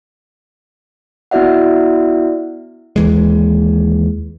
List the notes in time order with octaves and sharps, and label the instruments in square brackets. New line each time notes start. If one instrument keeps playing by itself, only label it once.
[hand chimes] B3 E4 F#4 D5 E5 F#5
[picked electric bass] D#2 E3 G#3